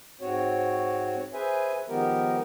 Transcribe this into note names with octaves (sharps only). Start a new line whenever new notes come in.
G#2 C4 F#4 C#5
G#4 B4 C5 E5 G#5
D#3 F3 G#3 B3 G4 A#4